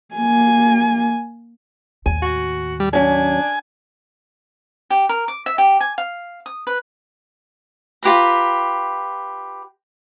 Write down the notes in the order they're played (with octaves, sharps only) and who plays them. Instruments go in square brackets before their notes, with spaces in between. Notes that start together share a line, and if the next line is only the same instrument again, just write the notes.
[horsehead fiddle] A#3 G#5
[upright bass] D#2 A2 [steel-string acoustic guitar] G#5
[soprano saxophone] F#4
[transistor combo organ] G3
[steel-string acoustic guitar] F#3 C#4 [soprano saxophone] D4 [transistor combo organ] G#5
[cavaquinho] G4
A#4
D6
E5
G4
G#5
F5
D#6
B4
F4 G4 B4 A#5